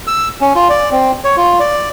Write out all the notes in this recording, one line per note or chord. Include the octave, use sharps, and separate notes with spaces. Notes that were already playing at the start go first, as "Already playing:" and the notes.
E6
C#4
F4
D5
C4
C#5
F4
D5